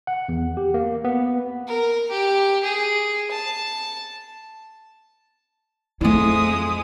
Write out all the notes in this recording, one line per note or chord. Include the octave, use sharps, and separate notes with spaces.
F#5
E2
G4
A#3
B3
A#4
G4
G#4
A5
F2 G#3 A3 E4 D#6